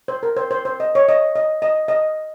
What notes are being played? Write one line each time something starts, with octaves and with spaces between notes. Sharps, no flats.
C5
A#4
C5
C5
C5
D#5
C#5
D#5
D#5
D#5
D#5